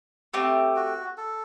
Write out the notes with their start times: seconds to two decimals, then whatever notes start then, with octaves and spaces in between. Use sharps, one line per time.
0.34 A3 C4 G4
0.76 F#4
1.18 A4